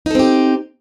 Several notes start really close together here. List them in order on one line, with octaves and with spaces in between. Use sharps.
D#4 A4 C4 G4